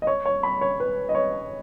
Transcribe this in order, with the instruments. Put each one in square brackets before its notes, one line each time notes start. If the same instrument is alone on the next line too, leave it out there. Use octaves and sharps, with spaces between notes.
[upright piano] D#5
C#5
C#5
B5
C#5
B4
D#5
C#5